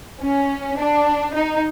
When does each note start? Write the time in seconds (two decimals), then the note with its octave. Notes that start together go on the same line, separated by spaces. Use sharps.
0.21 C#4
0.78 D4
1.34 D#4